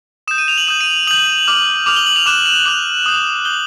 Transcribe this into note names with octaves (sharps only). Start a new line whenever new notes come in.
D#6 G6 E7
D#7
F7
F#7
D#6 G6 E7
D#7
D#6 G6 F#7
D6 F6
D6 F6 F7
G7
F#7
F7
D6 F#6 E7
E7
D6 F#6 F7
D#6 G6
D#6 G6 G7